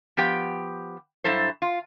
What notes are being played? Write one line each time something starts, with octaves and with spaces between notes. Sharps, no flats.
F3 B3 G4 G5
G2 F#3 E4 A4 C5
F4